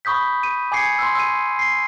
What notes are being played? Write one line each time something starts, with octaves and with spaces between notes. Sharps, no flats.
B5 C#6 D#6 G6 B6
D#7
G#5 D6 G#6 C7 C#7
C6 E6
E6 D#7
C7